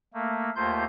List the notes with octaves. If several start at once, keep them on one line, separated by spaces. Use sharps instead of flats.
A3 A#3
D#2 A3 A#3 F4 C5 G6